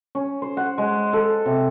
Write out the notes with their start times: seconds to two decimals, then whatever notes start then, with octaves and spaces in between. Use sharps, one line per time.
0.15 C#4
0.42 C5
0.57 F#5
0.78 G#3
1.13 A4
1.46 C3